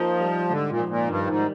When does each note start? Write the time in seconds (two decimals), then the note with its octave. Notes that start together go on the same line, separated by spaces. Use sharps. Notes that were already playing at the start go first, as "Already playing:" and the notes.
Already playing: F3 A#3 D#4
0.20 G3
0.49 G#2 D3
0.69 A#2
0.79 F3
0.88 A#2
1.08 G2 D#3
1.27 G#2
1.37 G3